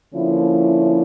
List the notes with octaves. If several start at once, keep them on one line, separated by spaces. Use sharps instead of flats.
D3 F3 A#3 C#4 E4